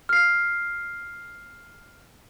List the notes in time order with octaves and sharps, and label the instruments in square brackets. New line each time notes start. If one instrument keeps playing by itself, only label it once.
[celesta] F6 C7